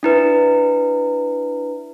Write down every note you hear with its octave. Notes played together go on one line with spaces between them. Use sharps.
D4 E4 B4